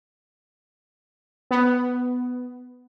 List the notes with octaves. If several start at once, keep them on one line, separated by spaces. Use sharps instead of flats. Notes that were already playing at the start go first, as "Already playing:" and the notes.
B3